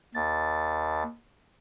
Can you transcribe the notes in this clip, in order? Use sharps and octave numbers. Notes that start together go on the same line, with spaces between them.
D#2 A6